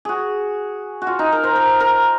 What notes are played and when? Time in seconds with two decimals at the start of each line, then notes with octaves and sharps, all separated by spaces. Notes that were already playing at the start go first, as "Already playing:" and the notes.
0.05 F#4 G#4
1.02 F#4
1.07 F4
1.19 D#4
1.32 A#4
1.44 C5
1.56 A#4
1.80 A#4